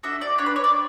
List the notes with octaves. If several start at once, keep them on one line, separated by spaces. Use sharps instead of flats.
D4 F#4 A4 E5
D5
D4 G4 B4 C#5
C#5
D5